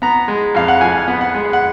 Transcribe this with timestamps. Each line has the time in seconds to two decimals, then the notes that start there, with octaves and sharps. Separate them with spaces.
0.02 B3 A#5
0.28 G#3
0.55 F2 F5
0.68 F#5
0.81 F3 G#5
1.08 B3
1.21 F#5
1.35 G#3
1.53 F#5